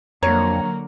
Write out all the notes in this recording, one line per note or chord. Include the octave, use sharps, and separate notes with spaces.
F2 D3 F#3 A#3 C#5 A#5